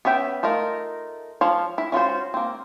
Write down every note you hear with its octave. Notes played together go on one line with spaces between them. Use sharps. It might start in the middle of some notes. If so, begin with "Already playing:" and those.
B3 C#4 E5 G5
A3 D#4 F4 A#4
F3 C#5 F5
E4
C#4 F4 F#4 C5
A#3 C4